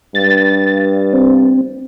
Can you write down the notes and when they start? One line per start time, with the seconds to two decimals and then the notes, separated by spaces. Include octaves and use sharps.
0.15 G2 A6
1.13 C4